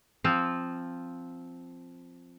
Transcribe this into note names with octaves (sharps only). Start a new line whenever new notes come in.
F3 C4 F4